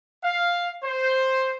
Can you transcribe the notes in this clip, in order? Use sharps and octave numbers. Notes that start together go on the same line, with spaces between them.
F5
C5